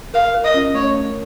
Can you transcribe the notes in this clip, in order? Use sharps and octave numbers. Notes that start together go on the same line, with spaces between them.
A#4 F5
A#4
D#5
C#4
A3 C#5
A3